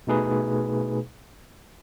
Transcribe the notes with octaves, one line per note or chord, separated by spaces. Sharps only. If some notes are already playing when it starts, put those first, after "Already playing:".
B2 A3 D#4 G#4 B4